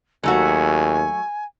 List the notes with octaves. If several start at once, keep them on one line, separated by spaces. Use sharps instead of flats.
D#2 F#3 A3 F#4 G#5